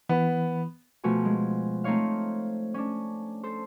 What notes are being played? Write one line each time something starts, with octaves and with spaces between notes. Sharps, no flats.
E3 B3 B5
B2 F3 A3 F#4 G#5
G#3
A3 C4 D#4 C5 C#5 F5
C#4 D4
A4 C5